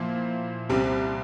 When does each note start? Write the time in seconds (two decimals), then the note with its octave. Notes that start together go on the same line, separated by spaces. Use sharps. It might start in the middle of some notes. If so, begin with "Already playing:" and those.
Already playing: A#2 F3 A#3 E4
0.69 C2 C3 G3 C4